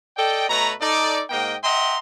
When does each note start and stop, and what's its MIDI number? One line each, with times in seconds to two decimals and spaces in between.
0.17 0.46 69
0.17 0.46 74
0.17 0.46 75
0.17 0.46 79
0.48 0.73 47
0.48 0.73 57
0.48 0.73 71
0.48 0.73 73
0.48 0.73 82
0.80 1.23 63
0.80 1.23 69
0.80 1.23 74
1.29 1.55 44
1.29 1.55 58
1.29 1.55 75
1.29 1.55 79
1.63 1.97 75
1.63 1.97 76
1.63 1.97 78
1.63 1.97 79
1.63 1.97 82
1.63 1.97 84